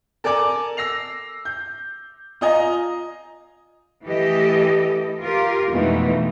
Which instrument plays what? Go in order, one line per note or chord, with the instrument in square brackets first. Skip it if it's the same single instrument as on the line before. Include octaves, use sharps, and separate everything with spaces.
[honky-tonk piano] A4 A#4 D5 G#5 D6
E6 A#6 C7 F7
G6
F4 D#5 G#5 A#5
[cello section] E3 A3 G4 A4 D#5
F4 G4 A#4
F2 B2 E3 G#3 A3 D#4